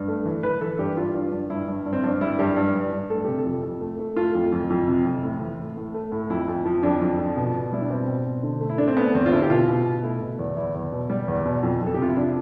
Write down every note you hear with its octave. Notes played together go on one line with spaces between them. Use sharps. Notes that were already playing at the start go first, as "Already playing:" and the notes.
Already playing: G2
A3
E3
E3 B4
E3 A4
G2 G4
G2 F4
G2
G2
G2 E4
G2
G2
C4
G2 D4
G3 E4
G2 G4
G2
G2
G2
A3 A4
C3 G4
A4
F2
F2
A3
A3
A3 F4
F2
F2
F2
C3
F2
A2
E3
A2
A2
A3
A2
F2 E4
F2
F3
F2 D4
F2
F3
B2
B2
G3 E4
D4
B2 C4
B2
B2
D3
A3
E4
A3 D4
C4
A3 B3
E2 C4
F4
D3 E4
G4
B2 F4
B2
B2
A3 E4
B2
E2
E2 E4
E2
B2
G3
E2
B2
F2
F2
A4
G4
C3 F4
E4
F3 D4